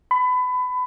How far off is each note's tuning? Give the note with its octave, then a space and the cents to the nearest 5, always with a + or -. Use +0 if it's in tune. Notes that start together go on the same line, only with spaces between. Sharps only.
B5 +25